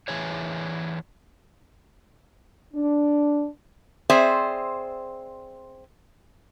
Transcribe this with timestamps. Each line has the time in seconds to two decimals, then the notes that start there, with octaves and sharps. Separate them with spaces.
0.08 E3 G#4 C#5
2.74 D4
4.10 C4 G#4 C5 D5 E5